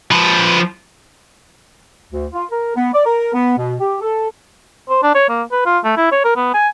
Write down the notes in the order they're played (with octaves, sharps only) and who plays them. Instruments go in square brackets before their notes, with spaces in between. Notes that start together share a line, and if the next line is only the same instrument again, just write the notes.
[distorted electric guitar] F3 B4
[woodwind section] D2
F4
A#4
B3
D5
A#4
B3
B2
G4
A4
[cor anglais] C5
D4
C#5
A#3
B4
F4
A3
E4
C#5
A#4
B3
G#5